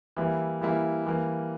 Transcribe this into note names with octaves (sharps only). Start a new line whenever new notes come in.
E3 G3 A#3 E4
E3 G3 A#3 E4
E3 G3 A#3